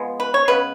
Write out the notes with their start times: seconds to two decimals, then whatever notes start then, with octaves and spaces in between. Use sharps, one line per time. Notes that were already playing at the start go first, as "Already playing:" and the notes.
Already playing: F3 G#3 B3
0.20 B4
0.34 C#5
0.48 C#3 G#3 B3 B4